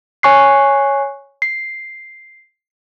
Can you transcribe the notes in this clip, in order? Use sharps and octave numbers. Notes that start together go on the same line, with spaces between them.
C#5 G#5 C#6 F#6 C7
C7